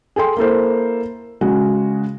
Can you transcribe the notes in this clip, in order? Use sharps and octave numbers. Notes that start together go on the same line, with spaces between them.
G#4 A4 G5 C6
A#3 E4 A4 C5
C#3 G#3 F#4